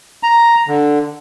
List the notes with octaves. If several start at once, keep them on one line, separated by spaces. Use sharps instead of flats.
A#5
D3